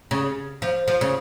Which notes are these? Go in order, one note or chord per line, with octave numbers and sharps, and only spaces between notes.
C#3
F3
F3
C#3